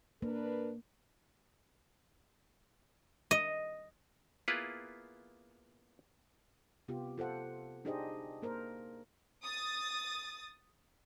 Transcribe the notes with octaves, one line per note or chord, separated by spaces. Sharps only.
A#3 D4 A#4 B4
D#5
A#3 B3 E4 F4 G#4 B4
C3 B3 F4 G4
F4 A4 C5 F#5
D4 D#4 G4 G#4 C5 D#5
A#3 A#4 C5
D#6 A6